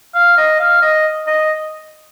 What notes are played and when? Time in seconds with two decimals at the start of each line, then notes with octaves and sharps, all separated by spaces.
0.15 F5
0.37 D#5
0.60 F5
0.82 D#5
1.27 D#5